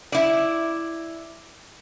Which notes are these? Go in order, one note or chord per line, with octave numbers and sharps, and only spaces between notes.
E4 D5